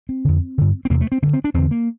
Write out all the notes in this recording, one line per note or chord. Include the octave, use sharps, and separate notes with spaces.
C4
F2 D3
G2 D3
C4
E2 C3 A#3
A3
C4
G2 D3 C4
C4
D4
E2 D3 C4
A#3